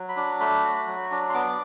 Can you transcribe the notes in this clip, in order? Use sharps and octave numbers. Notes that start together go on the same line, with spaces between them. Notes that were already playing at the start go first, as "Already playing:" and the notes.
Already playing: F#3
B5
D4
A3 B5
F#4
F#3
D4
C6
B3 D6